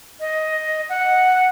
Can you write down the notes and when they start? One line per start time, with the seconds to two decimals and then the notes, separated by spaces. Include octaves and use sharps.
0.20 D#5
0.89 F#5